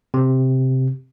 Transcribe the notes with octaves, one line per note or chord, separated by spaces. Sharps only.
C3